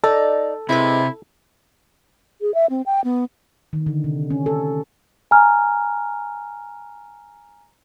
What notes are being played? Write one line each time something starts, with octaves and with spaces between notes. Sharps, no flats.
D#4 A4 D5
C3 G#3 C4 E4 B4
G#4
E5
C4
G5
B3
D#3
D3
C3
C#4
A4
G#5 A#5 F6